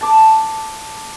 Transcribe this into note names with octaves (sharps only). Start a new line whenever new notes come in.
A5 D6